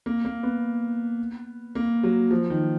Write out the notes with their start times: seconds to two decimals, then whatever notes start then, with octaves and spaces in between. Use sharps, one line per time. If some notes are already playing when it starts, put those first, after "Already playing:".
0.06 A#3
0.25 A#3
0.43 B3
1.75 A#3
2.03 F#3
2.31 F3
2.50 D#3